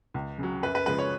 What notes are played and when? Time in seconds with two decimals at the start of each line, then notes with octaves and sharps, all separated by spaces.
0.14 C#2
0.38 C#3 F#3
0.62 F#2 B4
0.75 B4
0.86 C#3 F3 G#3 B4
0.99 C#5